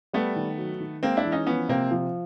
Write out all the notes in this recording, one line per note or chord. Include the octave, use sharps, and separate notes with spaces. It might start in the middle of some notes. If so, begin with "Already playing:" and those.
G3 A3 B3
D#3
F#3
D#3
G#3 A#3 C4
D4 E4
E3
C#4 D#4
F3 B3 C#4
C3 A#3 C4
F3